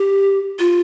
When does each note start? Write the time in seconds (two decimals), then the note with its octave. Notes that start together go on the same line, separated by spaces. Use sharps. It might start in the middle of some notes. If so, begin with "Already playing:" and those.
Already playing: G4
0.59 F4